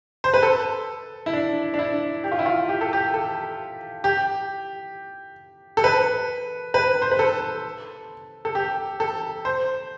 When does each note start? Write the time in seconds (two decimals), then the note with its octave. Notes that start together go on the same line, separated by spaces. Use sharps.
0.24 C5
0.34 B4
0.43 A4
1.26 E4
1.33 D4
1.74 D4
1.79 E4
2.24 G4
2.32 F4
2.39 E4
2.46 F4
2.69 G4
2.81 A4
2.93 G4
3.14 A4
4.04 G4
5.77 A4
5.84 B4
6.74 B4
7.02 C5
7.11 B4
7.19 A4
8.45 A4
8.55 G4
9.00 A4
9.45 C5